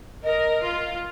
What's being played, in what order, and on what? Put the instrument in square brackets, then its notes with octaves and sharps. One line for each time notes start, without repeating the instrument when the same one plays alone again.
[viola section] A#4 [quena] D#5
[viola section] F4